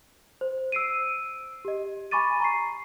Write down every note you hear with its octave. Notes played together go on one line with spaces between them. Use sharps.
C5
E6 C7 D7 D#7
G4 D#5
G#5 B5 C#6 D6 A6 D#7
A#5 C#6 C7